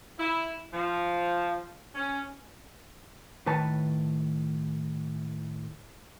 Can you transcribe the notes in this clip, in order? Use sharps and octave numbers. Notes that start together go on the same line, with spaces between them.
E4
F3
C#4
A2 D#3 B4 C#5 A5